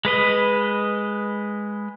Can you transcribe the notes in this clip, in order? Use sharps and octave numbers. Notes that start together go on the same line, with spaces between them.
G#3 B4 D#5